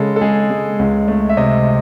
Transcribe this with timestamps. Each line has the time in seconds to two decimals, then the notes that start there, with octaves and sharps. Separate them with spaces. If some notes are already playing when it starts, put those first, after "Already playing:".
Already playing: C#3 G#3 A4
0.16 A4
0.21 G#3 G#4
0.50 G#3
0.79 C#2
1.08 A3
1.29 E5
1.37 C3 D#5